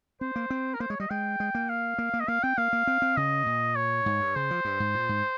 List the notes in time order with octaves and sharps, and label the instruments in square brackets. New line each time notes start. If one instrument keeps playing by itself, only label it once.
[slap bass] C4 [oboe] C5
[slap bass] A#3
C4
[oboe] A#4
[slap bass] A#3 [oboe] C5
[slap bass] G#3 [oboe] C#5
[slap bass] G3 [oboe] D#5
[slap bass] G#3 [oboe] G5
[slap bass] G#3
A#3
[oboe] F5
[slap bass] A#3
A#3
[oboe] D#5
[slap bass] A#3 [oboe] F5
[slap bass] C4 [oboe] G5
[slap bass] A#3 [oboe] F5
[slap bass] A#3
C4
C4
[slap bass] C#3 [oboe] D#5
[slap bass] A#2
[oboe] C#5
[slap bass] G#2
G2
[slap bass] C#3 [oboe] C5
[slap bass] F3
G2
G#2
A#2
G#2